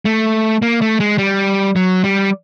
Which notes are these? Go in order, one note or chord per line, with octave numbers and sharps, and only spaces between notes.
A3
A#3
A3
G#3
G3
F#3
G3